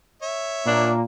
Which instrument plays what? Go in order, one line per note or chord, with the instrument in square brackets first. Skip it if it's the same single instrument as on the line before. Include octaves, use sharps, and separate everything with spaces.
[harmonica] C#5 E5
[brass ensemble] A#2 A#3 [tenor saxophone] D4